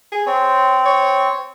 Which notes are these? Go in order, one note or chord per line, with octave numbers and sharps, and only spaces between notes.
G#4
C4 C#5
C#5